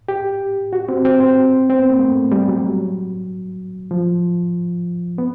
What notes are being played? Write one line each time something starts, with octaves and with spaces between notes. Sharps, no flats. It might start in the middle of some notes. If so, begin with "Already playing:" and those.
G4
F#4
C4
C4
C4
C4
B3
A#3
A3
G3
F#3
F3
B3